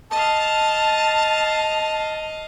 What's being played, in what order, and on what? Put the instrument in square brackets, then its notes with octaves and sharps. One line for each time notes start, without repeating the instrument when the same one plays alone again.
[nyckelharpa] D#5 F5 [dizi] A5